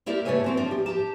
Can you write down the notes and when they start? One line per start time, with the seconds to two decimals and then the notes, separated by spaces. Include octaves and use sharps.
0.06 A#3 E4 G4 A#4 D5
0.25 C#3 A3 B4 C#5 E5 G#5
0.44 E3 C4 F#4
0.57 F3 D4
0.71 G4
0.86 G4 A5